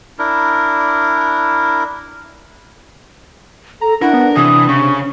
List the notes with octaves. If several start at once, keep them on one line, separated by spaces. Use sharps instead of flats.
D4 E4 A#4
A4 A#5
D4 E4 A#4 F#5
B3
C3 E3 D#6
C#3 C#6